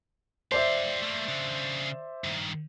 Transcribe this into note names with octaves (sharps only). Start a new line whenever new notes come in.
G4 C5 D5 E5 F5
A3 A#3
C#3 D4
G2 D#3